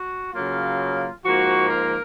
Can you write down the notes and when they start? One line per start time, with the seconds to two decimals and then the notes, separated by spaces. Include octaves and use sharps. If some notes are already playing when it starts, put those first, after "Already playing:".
Already playing: F#4
0.33 C#3 F#3 A#3 F4
1.24 G#2 F3 A#3 F#4
1.68 A#4